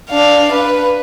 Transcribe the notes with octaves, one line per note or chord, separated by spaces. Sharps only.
D4 F5
B4